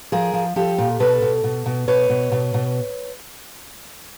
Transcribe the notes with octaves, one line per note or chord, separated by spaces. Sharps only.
F3 G#4 A#4
F3
F3 G4 A4
A#2
B2 A4 B4
B2
B2
B2
B2 B4 C#5
B2
B2
B2